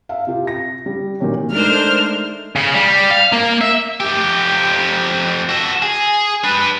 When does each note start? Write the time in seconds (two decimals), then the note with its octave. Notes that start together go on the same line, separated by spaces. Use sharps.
0.09 E5 F5
0.27 C3 F4 G4
0.47 A#6
0.86 G3
1.20 A#2 D#3 F#3 G4 C#5
1.53 G#3 A3 D4 D#4 A#4 C5 F6
2.56 C#3
2.74 G3
3.11 F5
3.33 A#3
3.61 E5
4.00 F2 G4
5.49 F#4 A4
5.82 G#4
6.44 D4 B4